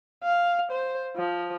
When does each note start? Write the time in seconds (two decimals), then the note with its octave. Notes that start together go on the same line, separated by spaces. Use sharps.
0.23 F5
0.72 C5
1.16 F3